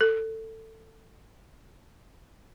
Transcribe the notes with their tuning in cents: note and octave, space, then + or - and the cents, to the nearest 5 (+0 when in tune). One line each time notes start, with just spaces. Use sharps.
A4 +20